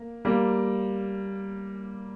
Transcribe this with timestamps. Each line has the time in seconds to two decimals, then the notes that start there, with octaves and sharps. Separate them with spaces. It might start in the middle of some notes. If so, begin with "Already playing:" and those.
Already playing: A#3
0.25 G3 A#3